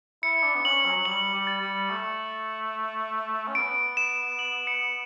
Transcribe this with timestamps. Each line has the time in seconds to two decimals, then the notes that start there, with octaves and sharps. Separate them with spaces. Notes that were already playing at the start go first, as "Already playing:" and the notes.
0.23 E4 C#7
0.43 D4
0.55 B3
0.65 C#4 F#7
0.85 F#3
0.97 F#3
1.05 G3 F#7
1.34 G3
1.47 A6
1.61 G3
1.90 A3 C#7
3.48 C#4
3.55 B3 D7
3.97 E7
4.39 F#7
4.67 C#7